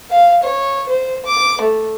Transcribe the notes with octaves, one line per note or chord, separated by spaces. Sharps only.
F5
C#5
C5
D6
A3